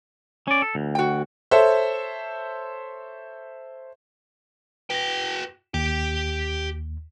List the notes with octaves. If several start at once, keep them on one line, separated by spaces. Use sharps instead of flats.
C#4 D5
A4
D2
F#4 G5
A4 C5 C#5 E5
F#4 B4 G5 A#6
D#2 G4 G5